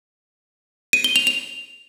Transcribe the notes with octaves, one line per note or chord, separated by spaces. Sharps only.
D#7
G7
F7
F7